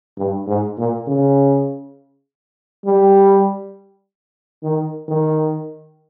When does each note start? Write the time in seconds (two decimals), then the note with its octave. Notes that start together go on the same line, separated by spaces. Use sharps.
0.17 G2
0.47 G#2
0.78 A#2
1.08 C#3
2.85 G3
4.63 D#3
5.08 D#3